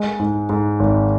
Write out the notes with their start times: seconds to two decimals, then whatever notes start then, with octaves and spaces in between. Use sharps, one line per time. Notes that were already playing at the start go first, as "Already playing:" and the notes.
Already playing: G#3
0.19 G#2
0.49 G#2
0.80 G#1